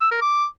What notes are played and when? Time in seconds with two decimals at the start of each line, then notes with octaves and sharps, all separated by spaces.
0.01 E6
0.11 A#4
0.22 D6